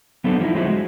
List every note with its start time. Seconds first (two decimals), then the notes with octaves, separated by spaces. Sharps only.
0.24 F#3 B3 C4 D4 A4
0.40 F3 G#3 C4 D#4 E4
0.55 F3 F#3 G#3 C4 E4 F#4
0.69 G#3